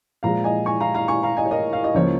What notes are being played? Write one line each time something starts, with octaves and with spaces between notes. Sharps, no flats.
A#2 F3 G#3 F5 A#5
D#5 G#5
G#5 C#6
F5 A#5
F5 A#5
G#5 C#6
F5 A#5
D#5 G#5
C#5
A#4 D#5
F5
D#5
C#2 C#3 F3 A#3 C#5